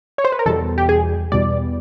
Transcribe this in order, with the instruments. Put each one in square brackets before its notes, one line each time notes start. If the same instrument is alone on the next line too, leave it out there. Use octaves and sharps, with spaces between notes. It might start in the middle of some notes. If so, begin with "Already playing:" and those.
[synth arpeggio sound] C#5
C5
B4
A#4
E2 B2 G3 A4
G4
G#4
E2 B2 G3 D5